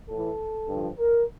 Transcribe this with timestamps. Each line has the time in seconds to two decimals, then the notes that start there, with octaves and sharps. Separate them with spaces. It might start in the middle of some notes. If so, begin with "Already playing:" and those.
0.09 A2 E3 A4
0.68 G2 D3 F3
0.97 A#4